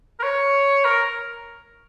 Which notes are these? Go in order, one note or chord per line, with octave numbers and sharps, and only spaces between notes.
A#4
C#5
A#4